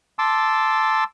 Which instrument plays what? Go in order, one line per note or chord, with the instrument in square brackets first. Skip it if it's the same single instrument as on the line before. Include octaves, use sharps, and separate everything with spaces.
[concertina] A5 C6 D6 E6